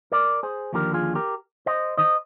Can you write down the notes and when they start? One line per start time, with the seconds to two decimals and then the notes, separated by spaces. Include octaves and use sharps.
0.12 A#4 D5
0.43 G#4 C5
0.73 D#2 D3 F3 G4 A#4
0.94 F4 G#4
1.15 G4 A#4
1.66 C5 D#5
1.98 D#3 C5 D#5